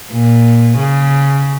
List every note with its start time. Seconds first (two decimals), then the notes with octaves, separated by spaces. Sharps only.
0.13 A#2
0.78 C#3